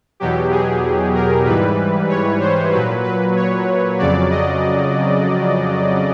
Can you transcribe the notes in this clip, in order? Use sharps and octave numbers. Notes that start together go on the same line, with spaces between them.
E2 B2 F#3 G4
G#4
A#4
G#2 E3 G3 B4
C#5
C5
A#2 F#3 B4
B4
C#5
F2 C#3 F#3 D5
D#5